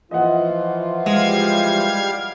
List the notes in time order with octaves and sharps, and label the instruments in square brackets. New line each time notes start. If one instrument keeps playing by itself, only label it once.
[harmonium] E3 F3 F4 [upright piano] D#5 F#5
[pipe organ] G3 F5 G#6 [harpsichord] G#3